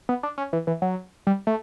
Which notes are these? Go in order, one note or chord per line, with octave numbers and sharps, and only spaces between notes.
B3
D4
C#4
E3
E3
F#3
G3
A3